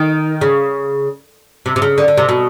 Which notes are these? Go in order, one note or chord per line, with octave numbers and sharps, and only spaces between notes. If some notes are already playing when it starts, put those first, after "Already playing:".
Already playing: D#3
C#3
C3
C3
C#3
D3
D3
C3
B2